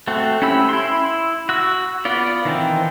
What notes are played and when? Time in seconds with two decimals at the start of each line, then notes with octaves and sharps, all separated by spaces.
0.07 A3 C4 F#4
0.42 C#4 E4 G4 B5 E6
0.69 E4 C6
1.49 F#4 E6
2.05 B3 F4 D5
2.45 D#3 E3 C4